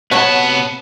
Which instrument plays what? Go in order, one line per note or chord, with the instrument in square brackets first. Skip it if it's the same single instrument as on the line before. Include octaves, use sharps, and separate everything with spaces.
[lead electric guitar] C3 A5 [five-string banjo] F#3 C#5 F#5 [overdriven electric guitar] B3